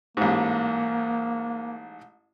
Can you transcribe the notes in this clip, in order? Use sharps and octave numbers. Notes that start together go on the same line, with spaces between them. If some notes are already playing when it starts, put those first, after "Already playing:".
A1 G#2 A#3